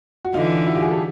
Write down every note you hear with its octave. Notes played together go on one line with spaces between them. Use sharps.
F#4
D3 E3 D#4 F4
E4 F#4
F4 G4
F#4 G#4
G4 A4